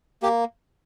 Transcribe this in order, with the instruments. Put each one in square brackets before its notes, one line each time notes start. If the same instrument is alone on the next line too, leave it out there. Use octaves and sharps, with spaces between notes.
[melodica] A#3 G4